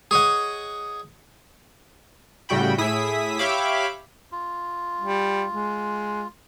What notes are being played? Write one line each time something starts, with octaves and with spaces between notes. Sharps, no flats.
G#4 C#5 D#5 F#5
A2 C#3 G3 F#4 G5 B5
A2 E4 G#4 E5 D#6 B6
G4 C#5 E5 F5 B5 D6
F4
G3
G#3